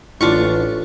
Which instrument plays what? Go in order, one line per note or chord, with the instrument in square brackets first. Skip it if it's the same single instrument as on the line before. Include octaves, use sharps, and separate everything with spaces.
[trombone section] A1 [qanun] D4 F4 C#6